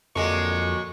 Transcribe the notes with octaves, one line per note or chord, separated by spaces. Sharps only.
A#1 F2 D3 F#3 G#3 C#6